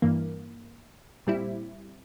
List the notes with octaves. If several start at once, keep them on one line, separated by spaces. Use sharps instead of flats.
G2 E3 A#3
A#2 G3 C4 E4